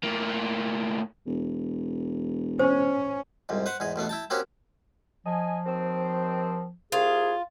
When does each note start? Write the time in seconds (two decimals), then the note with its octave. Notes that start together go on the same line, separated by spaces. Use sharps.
0.04 A2 A#3
1.26 E1
2.59 C#4 C5
3.49 C2 F2 G#2
3.66 B4 C5 F#5
3.80 E2 G#2 G#4
3.96 A1 B2 A3 B3
4.09 E4 G5 A5
4.30 A#3 C4 C#4 F#4 G4
5.26 F3 D#5 G#5
5.66 D#2 D#3 C4
6.92 C2 F4 G#4